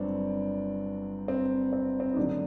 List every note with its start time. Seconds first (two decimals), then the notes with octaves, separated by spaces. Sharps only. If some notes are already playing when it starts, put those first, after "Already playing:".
Already playing: G1 G2 F#3 C4 D4
1.28 C4
1.73 C4
2.00 C4
2.13 D#4
2.17 F#1 F#2 D3 F#3 D4